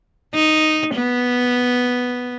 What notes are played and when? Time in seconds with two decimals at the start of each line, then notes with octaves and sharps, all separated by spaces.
0.34 D#4
0.95 B3